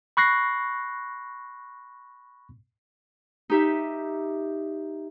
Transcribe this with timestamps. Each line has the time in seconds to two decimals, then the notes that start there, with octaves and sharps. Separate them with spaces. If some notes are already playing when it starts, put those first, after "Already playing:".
0.17 B5 C#6 F#6 A#6 C7
3.50 D#4 G4 E5